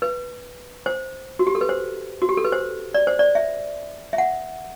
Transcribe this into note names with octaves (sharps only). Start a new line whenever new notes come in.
B4
C5
F#4
G4
A4
B4
C5
F#4
G4
A4
B4
C5
D5
C5
D5
E5
E5
F#5